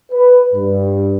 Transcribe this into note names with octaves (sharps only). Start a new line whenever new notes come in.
B4
G2